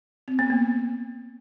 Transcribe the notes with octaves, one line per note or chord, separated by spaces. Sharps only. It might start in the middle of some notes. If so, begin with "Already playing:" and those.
C4
B3
A#3